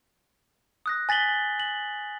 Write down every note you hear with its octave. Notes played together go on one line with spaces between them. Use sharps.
D#6 F#6 A#6
G#5 A6 B6 F#7 G7
F#7